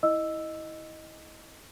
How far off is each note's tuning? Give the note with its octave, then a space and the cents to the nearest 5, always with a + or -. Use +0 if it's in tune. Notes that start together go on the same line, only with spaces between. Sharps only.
E4 -20 D#5 +0 E6 +0